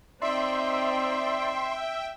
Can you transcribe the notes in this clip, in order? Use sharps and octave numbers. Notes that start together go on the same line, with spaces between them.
C4 D#4 D5 E5 G5 C6